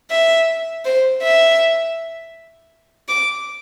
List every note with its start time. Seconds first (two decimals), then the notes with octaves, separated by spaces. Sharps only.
0.10 E5
0.85 C5
1.22 E5
3.09 D6